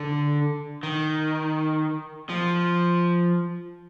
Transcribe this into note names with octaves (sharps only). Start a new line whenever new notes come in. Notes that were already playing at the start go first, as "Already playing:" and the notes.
Already playing: D3
D#3
F3